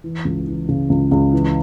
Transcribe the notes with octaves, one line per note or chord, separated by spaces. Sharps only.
E3
C#2
E3
C#3
C#2
C#2
E3